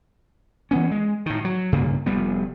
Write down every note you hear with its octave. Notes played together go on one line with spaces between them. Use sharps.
E3 B3 C#4
G#3
A2 D#3
F#3
B1 G2 C#3 A#3
F1 G3 B3